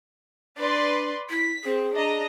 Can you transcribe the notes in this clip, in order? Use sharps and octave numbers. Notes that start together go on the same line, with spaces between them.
D4 B4 D5 C6
E4 B6
C4 G#4
D4 D#5 A#5